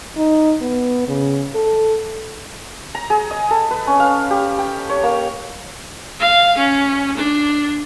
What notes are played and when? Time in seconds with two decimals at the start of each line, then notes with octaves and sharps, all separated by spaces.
0.17 D#4
0.61 B3
1.08 C#3
1.55 A4
2.95 A#5
3.10 G#4
3.31 D#5
3.51 A4
3.71 B4
3.87 C#4
4.00 F5
4.30 G4
4.58 G5
4.89 C#5
5.03 A#3
6.20 F5
6.58 C#4
7.17 D4